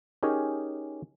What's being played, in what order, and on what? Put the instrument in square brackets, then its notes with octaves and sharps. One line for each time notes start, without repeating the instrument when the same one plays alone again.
[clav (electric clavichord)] C#4 D#4 G4 G#4 A#4 C#5